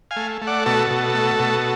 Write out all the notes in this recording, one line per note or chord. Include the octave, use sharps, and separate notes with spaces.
F5 G#5
A3
A3
D5 F#5
B2 F#4 A4
B2
A3
B2